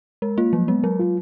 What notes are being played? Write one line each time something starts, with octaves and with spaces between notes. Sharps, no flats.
G#3 A#4
A#3 F4
F3 F#3
G#3 B3
F#3 A#4
F4